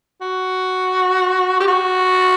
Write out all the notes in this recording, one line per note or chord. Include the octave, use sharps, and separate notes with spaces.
F#4
G4
F#4